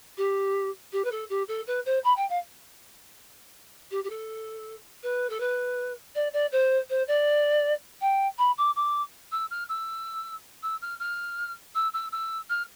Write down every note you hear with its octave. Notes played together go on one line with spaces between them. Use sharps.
G4
G4
B4
A4
G4
A4
B4
C5
B5
G5
F5
G4
G4
A4
B4
A4
B4
D5
D5
C5
C5
D5
G5
B5
D6
D6
E6
F6
E6
E6
F6
F6
E6
E6
E6
F6